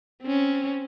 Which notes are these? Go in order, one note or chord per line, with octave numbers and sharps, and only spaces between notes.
C4 C#4